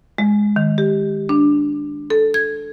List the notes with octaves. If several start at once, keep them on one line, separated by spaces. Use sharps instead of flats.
G#3
D#3
G4
D4
A4
G#6